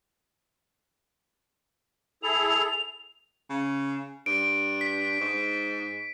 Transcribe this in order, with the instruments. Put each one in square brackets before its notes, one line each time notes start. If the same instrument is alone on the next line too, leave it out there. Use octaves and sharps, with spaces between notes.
[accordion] E4 G#4 A4 [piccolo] F7
[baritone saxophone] C#3
[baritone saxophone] G2 [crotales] D7
[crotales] B6
[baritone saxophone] G#2